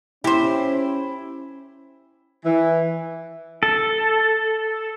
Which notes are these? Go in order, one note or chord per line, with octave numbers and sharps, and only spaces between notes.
C#4 E4 G4 C5
E3
A4